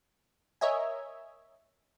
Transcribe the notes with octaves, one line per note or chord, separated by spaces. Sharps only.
A#4 C#5 D#5 E5 G#5